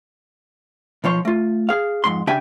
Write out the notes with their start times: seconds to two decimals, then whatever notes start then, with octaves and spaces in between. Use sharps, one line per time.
1.04 B1 F3 C#5 C6
1.25 A3 F4
1.69 G#4 F5
2.04 F2 G#2 C6
2.27 C#3 D4 G4 E5 G5 G#5